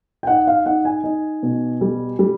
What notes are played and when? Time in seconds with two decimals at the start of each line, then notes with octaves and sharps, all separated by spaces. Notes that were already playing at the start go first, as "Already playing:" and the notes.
0.23 G5
0.27 D#4 F#5
0.47 F5
0.66 D#4 F#5
0.85 G#5
1.04 D#4
1.43 B2
1.81 G3
2.19 G3